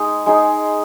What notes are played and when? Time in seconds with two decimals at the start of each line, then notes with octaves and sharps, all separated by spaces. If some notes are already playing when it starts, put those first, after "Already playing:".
Already playing: G#3 D#4 G#4
0.26 G#3 D#4 G#4